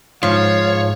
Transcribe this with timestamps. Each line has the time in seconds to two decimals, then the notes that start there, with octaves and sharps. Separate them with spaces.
0.23 G#2 F3 C#5 F5